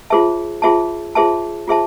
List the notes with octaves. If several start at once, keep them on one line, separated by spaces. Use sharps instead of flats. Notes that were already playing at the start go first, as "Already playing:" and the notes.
F4 G#4 C5 E5 A5
F4 G#4 C5 E5 A5
F4 G#4 C5 E5 A5
F4 G#4 C5 E5 A5